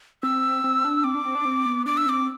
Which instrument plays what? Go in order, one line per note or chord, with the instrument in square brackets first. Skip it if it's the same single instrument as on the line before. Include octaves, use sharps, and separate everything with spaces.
[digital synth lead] C4 [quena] E6
[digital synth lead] C4
D4
[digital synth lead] C4 [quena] D6
[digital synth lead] D4
C4
D4
C4
B3
[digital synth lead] D4 [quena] D6
[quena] E6
[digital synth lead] C4 [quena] D6